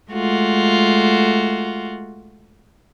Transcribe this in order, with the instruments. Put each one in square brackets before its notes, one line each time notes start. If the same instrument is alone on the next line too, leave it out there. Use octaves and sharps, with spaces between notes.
[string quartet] G#3 A3 F4 F#4